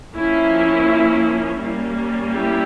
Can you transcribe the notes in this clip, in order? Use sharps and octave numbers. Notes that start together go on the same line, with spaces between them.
F3 A#3 C#4 E4
G3 A#3 C#4
E4 G4